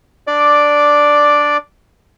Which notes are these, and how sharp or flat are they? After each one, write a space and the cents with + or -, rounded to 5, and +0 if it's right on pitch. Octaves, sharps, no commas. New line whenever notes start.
D4 +0 D5 +0 D6 +0